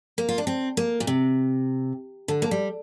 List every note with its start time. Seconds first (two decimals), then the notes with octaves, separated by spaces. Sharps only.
0.18 A#3
0.29 F4
0.38 D4
0.47 C4
0.77 A#3
1.00 A#2
1.07 C3
2.28 D3
2.42 A#3
2.51 G3